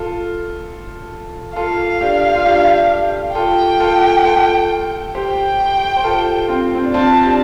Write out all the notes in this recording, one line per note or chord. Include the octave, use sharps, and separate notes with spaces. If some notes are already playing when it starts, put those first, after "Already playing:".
Already playing: F4 A4
F4 A4 F5
D4 G4
F4
D4 G4
F4 A4 G5
F4 A4
F4 A4
G4 C5 G5
C5
F4 A4
C4 F4
C4
D4
C4 F4 A5
D4 G4